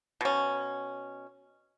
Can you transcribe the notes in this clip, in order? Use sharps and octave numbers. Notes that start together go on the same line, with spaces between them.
B2 C#4